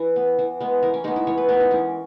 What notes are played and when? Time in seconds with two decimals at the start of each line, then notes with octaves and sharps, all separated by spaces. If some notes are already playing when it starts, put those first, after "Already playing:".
Already playing: E3 B4
0.16 B3
0.39 E3
0.60 G#3 B3
0.82 E3 A#4
0.94 C#4
1.04 G#3 B3 D#4
1.16 E4
1.27 E3 C#5
1.38 B4
1.49 G#3 B3 A#4
1.60 D#4
1.71 E3 C#4